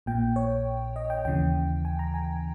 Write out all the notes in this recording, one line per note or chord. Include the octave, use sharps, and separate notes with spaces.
A#1 A#2 G5
C#5
D#5
G5
D#2 C#3 E3 G5
G#5
A#5
G#5